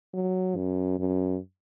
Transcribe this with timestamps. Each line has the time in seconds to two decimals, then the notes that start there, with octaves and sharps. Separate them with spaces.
0.14 F#3
0.56 F#2
0.99 F#2